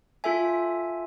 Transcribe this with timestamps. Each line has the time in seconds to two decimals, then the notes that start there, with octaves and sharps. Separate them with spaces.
0.24 F4 A4 E5 G#5